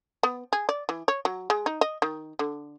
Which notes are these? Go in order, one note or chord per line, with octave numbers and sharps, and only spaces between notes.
B3
G#4
D5
E3
C#5
F#3
G#3
D#4
D#5
D#3
D3